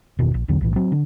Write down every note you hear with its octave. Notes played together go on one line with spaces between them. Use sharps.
G1 E2 B2 D#3
A#1
B1 E2 D3 F#3
B1 A2 E3
F#3 C4
D3